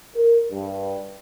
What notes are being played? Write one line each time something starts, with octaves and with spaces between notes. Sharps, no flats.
A#4
G2